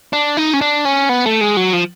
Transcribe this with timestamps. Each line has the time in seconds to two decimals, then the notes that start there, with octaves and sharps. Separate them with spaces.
0.13 D4
0.37 D#4
0.53 C#4
0.61 D4
0.85 C#4
1.09 B3
1.26 A3
1.41 G#3
1.57 F#3
1.73 F3